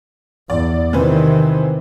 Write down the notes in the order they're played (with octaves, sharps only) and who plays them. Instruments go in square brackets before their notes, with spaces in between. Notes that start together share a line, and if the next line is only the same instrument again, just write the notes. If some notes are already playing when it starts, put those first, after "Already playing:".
[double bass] E2 [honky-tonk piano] D5
[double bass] C3 D#3 [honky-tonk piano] E3 C4 B4